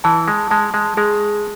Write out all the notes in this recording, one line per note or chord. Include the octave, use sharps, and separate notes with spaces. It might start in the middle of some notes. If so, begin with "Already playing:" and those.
E3 A5
G#3
G#3 A5
G#3
G#3 G#4